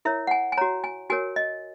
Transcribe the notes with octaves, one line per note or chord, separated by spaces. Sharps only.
E4 A#4 C#5 E5
F#5
G#5
G#5
F#4 C#5 A#5
G#5
F#4 A#4 C#5 G#5
D#5